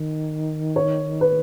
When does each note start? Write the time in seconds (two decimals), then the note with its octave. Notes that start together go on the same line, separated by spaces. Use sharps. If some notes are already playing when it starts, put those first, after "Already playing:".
Already playing: D#3
0.76 C#5
1.21 B4